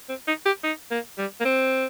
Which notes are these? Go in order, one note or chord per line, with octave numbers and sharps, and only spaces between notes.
C4
D#4
G4
D#4
A#3
G3
A#3
C4